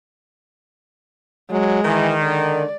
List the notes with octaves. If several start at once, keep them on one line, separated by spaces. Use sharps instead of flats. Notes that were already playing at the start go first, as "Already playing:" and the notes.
F#3 G#3
D#3 E3
D3 D5